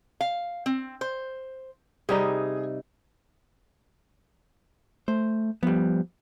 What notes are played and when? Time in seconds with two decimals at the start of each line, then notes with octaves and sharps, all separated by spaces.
0.21 F5
0.66 C4
1.01 C5
2.09 C3 G3 D#4 G#4
5.08 A3 C5
5.63 F3 G3 B3